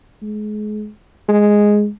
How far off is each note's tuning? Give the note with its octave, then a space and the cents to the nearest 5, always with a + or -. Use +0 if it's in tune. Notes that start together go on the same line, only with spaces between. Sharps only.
G#3 +30
G#3 +0